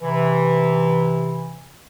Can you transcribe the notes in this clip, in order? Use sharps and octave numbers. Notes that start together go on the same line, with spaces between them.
C3 E3